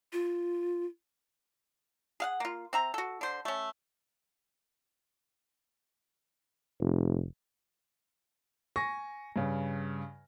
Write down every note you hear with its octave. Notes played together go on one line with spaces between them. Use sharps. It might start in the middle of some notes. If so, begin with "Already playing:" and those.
F4
G#4 F5 F#5
A#3 F4
C4 E5 A#5
F#4 A4
D3 C5
A3 C#4
F1
G#5 C#6 A#6
G2 C#3